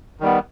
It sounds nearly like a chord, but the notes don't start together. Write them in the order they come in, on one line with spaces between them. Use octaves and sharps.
D#3 G3 B3